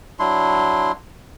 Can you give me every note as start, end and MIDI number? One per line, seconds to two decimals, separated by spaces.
0.19 0.92 54
0.19 0.92 62
0.19 0.92 64
0.19 0.92 84